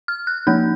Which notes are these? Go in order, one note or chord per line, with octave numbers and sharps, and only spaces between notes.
F6
F#6
F3 A#3 D#4 G6